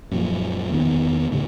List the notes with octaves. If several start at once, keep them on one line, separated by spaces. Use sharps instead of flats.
F#2 A#2 F3
E2 D#3 B3
D2 A2 C#3